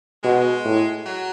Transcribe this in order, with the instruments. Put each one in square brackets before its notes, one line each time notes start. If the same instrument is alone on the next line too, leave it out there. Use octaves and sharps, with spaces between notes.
[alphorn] B2 [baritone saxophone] G#3
[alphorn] A2
[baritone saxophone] F#3